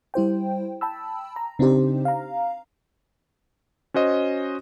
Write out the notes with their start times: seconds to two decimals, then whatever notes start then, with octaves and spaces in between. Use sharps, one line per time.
0.14 G3 E4 C5 G5
0.81 G5 A5 B5 E6
1.36 A#5
1.59 C#3 C4 D4 D#4 G4 C5
2.05 F5 A#5
3.94 C#4 F#4 C5 D#5